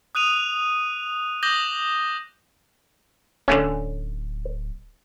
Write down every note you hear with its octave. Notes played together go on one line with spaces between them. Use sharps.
D#6 F#6 D#7 F7
D6 D#6 G6 A#6 F#7 G7
D1 D3 A3 C#4